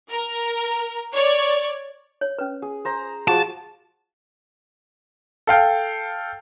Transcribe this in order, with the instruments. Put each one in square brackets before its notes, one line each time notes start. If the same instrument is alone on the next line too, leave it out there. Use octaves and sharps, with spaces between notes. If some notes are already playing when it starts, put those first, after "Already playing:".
[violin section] A#4
C#5 D5
[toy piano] C#5
C#4 B4
[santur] G#4
C5 A#5
[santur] F3 F#4 [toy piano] G#4 [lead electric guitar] A5
[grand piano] A4 F5 G5